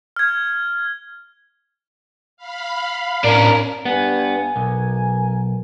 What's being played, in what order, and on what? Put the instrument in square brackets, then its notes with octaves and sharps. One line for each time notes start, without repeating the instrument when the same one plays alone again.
[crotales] F6 G#6
[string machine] F5 B5
[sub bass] A2 [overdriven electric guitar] C#4 D4 [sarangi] A#4
[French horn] G2 [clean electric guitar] B3 [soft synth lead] G#5
[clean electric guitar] B1 [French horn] A#4